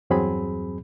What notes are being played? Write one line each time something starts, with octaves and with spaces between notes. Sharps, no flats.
E2 G2 F#3 C4 G#4 B5